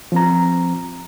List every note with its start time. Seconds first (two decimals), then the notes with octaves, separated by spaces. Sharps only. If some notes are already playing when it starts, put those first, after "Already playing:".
0.12 F3 C4 A#5